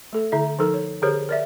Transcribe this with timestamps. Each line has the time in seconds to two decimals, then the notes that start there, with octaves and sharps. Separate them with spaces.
0.13 A3 A4
0.32 D3 E4 E5
0.59 F3 D#4 A4 A#4
0.74 C#5
1.02 D3 G4 G#4 A#4 C5 C#5
1.29 A#4 D5 E5